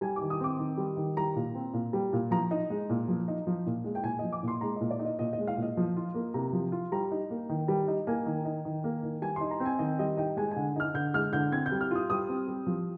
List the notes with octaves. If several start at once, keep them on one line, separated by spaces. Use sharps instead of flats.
G3 G#5
D6
D#3
D#6
C4 D6
D#3
G3
D#3
G3 A#5
A#2
C4
A#2
G3
A#2
F3 A#5
D#4
G#3
A#2
F3
D#4
F3
A#2
G#3
G5
A#2 G#5
F3 D#5
D6
A#2
C6
G#3 A#5
A#2 D#5
D5
D#4
D#5
A#2 D#5
D#5
G#3
F5
A#2
D#5
F3
F4
A#3
C3 A#5
F3
F4
G3 A#5
D#4
A#3
D#3
G3
D#4
A#3 G#5
D#3
D#4
D#3
A#3
D#3
G3 G#5
D#4 C6
A#5
C4
G#5
D#3 D#5
G3 D#5
D#4 G5
G#3 G#5
D3 G#5
D#4 F6
D3 G6
G#3 F6
D3 G6
C4 G#6
G6
G3
F6
F4 D#6
G3 D#6
C4
G3
F3